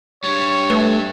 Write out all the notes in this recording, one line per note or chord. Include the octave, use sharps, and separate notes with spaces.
G2 G3 C#5
A3 B4